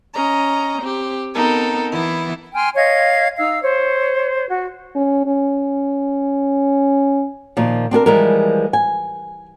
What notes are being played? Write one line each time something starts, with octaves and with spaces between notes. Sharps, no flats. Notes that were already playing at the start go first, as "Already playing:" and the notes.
C#4 D#5 A#5
C4 G4
B3 C4 D#4 A4 A#4
E3 B3 E4
G5 G#5 C6 F6
C#5 D#5 F5 G#6
D#4 F5 E6
C5 C#5
F#4
C#4
C#4
A#2 D#3 F3
C4 D4 G#4 A#4
E3 F3 G3 G#3 A#4
G#5